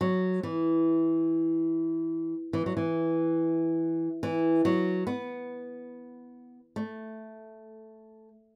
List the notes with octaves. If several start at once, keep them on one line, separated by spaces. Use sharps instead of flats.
F#3
E3
E3
F#3
E3
E3
F#3
B3
A3